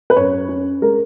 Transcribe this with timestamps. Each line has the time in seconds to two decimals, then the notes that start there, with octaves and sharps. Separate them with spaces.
0.10 B4
0.16 F#2 C#5
0.49 C#4
0.82 G#3 A#4